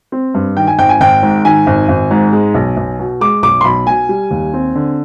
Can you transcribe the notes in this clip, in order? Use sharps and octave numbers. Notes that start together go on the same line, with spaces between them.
C4
G2
D#3 G5
G#5
G#1 G5
G#5
G#1 G5
G#2
D#3 G#5
G#1
G#1
G#2
G#3
B1
B1
B2
G#3 D6
B1 D6
C6
B1 B5
B2 G#5
G3
D#2
C4
D3